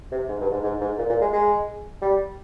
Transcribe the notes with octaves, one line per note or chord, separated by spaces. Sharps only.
C3
G#2
G2
G#2
G#2
G#2
A#2
A#2
G#3
G#3
G3